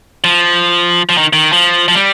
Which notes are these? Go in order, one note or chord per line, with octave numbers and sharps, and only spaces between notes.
F3
F3
D#3
D#3
F3
F3
G3